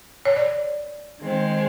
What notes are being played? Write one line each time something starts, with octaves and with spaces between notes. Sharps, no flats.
C#5
D5
D#3 G#3 C4